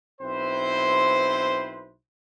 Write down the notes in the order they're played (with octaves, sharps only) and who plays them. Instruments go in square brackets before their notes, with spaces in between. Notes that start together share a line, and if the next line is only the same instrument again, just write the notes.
[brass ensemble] B1 C4 E4 B4 C5